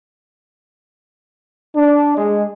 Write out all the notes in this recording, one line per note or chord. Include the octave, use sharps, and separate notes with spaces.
D4
G#3